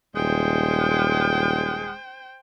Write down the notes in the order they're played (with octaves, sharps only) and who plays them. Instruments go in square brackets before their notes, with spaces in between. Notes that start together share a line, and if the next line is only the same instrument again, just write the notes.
[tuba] D#1 [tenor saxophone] G#3 [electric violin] C5 G5